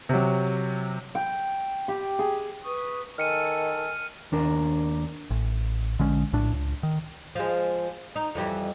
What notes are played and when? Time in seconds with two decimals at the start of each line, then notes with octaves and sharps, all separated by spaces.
0.09 C3 F#3
1.15 G5
1.88 G4
2.19 G#4
2.63 B4 C#6 D#6
3.18 D#3 A4 G#5 F6 C#7 D#7
4.32 D#2 D4 A#4
5.31 A1
5.99 A#1 D3 G#3 C#4
6.33 A#1 A2 D4
6.53 C#2
6.83 D#3
7.35 F3 G#3
8.16 D#4
8.35 F2 E3 G3